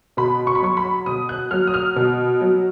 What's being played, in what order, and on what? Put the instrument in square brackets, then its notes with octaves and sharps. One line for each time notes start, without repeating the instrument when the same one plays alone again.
[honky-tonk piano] B2 B5
C#6
B5
F#3 C#6
B5
B2 D#6
F#6
F#3 F6
D#6
F6
B2
F#3